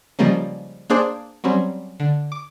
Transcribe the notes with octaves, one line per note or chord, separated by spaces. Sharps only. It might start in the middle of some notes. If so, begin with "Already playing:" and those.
C#3 F3 G3 G#3 A#3 C#4
A#3 D4 G#4 C5 D5
F#3 G3 C4 C#4
D3
D6